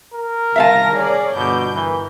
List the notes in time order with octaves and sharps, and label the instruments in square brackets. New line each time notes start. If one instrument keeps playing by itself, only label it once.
[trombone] A#4
[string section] C2 D#3 A#6 [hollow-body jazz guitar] E5 F5 A5
[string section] G#4 C#5 D5
[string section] G1 D6 G6 [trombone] B2
[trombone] E3 [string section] A#4